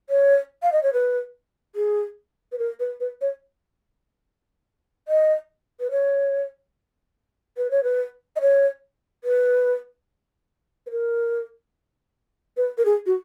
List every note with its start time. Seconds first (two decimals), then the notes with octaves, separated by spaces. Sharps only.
0.10 C#5
0.63 F5
0.72 D#5
0.83 C#5
0.93 B4
1.75 G#4
2.52 B4
2.59 A#4
2.80 B4
3.00 B4
3.21 C#5
5.08 D#5
5.80 B4
5.91 C#5
7.58 B4
7.71 C#5
7.83 B4
8.36 D#5
8.41 C#5
9.24 B4
10.87 B4
10.91 A#4
12.57 B4
12.78 A#4
12.85 G#4
13.06 F#4